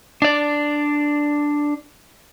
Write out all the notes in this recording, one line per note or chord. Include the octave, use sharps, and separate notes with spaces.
D4 D5